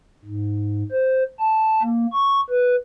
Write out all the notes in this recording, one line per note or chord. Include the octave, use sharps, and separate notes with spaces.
G#2
C5
A5
A#3
C#6
B4